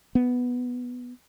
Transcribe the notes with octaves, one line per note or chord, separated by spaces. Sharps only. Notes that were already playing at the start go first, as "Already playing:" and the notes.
B3